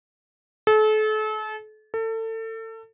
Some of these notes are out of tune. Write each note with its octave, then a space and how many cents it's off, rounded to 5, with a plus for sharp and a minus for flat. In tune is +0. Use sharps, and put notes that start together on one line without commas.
A4 -35
A4 +30